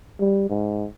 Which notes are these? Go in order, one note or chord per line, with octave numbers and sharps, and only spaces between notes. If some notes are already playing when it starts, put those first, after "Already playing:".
G3
G#2